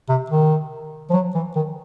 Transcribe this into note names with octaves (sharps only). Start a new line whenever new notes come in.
C3
D#3
F3
F#3
E3
D#3